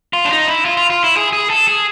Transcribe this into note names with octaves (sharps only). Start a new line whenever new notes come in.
F4
D4
D#4
E4
F4
F4
F4
E4
G#4
G#4
A4
G#4